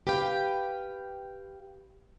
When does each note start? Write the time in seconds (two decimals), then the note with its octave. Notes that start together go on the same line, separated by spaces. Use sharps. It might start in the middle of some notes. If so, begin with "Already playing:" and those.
0.07 G4 B4 F5 G5